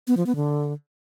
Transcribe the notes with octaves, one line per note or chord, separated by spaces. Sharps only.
B3
F3
B3
D3